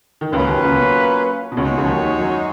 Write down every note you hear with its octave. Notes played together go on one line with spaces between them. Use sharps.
D#3
C#2 C#3 F#3 A#3 C#4 F4 B4
D#2 D#3
C#2 C#3
B2
B2
C#2 C#3 G#3 D#4 F#4 C#5
B2
C#2 C#3
F3
D#2 D#3
D#2 D#3
F#2 F#3